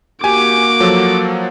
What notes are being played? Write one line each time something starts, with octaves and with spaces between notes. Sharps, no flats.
A#3 F#4 G4 G#5 D6
F3 F#3 A4